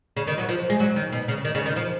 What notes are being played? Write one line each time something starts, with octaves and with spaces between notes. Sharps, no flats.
C#3
D#3
F#3
F3
G#3
F#3
D#3
B2
C#3
D#3
C#3
D#3
F3